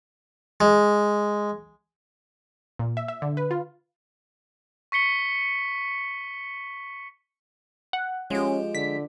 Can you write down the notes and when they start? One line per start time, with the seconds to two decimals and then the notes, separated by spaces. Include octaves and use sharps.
0.60 G#3
2.79 A#2
2.97 E5
3.08 E5
3.22 D3
3.37 B4
3.51 F4
4.92 C#6 B6 C#7 G7
7.93 F#5
8.31 F3 G#3 C#4 G4
8.75 D3 B6